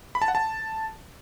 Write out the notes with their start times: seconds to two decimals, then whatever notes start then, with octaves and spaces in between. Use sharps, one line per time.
0.15 B5
0.22 A5
0.28 F#5
0.35 A5